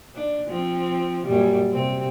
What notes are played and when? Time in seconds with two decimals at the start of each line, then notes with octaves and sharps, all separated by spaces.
0.15 D4
0.48 F3 C4
1.26 F#2 A#2 G3
1.71 C3 C4